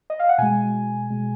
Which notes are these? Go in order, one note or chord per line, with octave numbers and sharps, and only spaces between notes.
D#5
F5
F#5
B2 G#3 G#5
B2 G#3